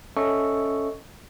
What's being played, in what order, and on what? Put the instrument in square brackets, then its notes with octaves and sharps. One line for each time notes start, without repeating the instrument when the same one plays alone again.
[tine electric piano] C#4 A4 D#5 E5 C#6